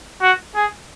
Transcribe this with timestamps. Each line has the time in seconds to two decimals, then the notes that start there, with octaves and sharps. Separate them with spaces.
0.22 F#4
0.56 G#4